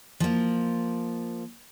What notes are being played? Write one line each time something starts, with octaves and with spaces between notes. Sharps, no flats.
F3 A#3